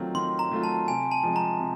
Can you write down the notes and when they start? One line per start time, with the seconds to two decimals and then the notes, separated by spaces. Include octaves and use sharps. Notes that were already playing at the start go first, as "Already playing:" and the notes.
Already playing: D#3 F#3 A3 C4 F4
0.15 D#3 C6
0.39 A#5
0.52 F#3 A3 C4 F4
0.64 A5
0.88 C3 G#5
1.11 A5
1.23 F3 G#3
1.36 A#5
1.60 C3